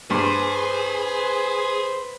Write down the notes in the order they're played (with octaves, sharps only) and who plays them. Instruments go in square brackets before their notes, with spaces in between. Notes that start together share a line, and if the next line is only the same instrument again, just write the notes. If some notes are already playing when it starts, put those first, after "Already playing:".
[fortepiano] G2 [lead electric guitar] G#4 [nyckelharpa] B4 [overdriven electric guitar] C5